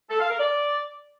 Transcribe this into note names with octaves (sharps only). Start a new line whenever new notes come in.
A4
F5
A#4
D5